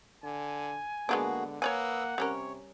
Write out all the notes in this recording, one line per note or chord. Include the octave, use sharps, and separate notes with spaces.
D3 G#5
D3 G#3 A#3 B3 D4 F#4 G#4
A#3 B4 C#5 D5 F#5 G#5 D#6 E6
C3 G3 C#4 A#4 C#5